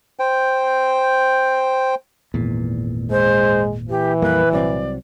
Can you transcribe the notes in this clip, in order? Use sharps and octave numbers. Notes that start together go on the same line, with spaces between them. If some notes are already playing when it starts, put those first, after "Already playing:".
C5 G5
G#1 E2 A#2
G#3 C5
E3 G4
F2 G3 A#3 B4
C2 F#3 C4 D5